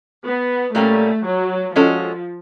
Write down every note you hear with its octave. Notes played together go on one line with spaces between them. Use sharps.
B3
A#2 G3 A3 A#3 C#4
F#3
F3 G#3 C#4 F#4 A4